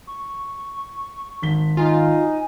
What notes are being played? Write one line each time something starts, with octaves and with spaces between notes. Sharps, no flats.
C#6
G#1 B6 G7
D#4 F4 G#5